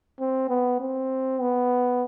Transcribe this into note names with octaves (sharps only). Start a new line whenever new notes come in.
C4
B3
C4
B3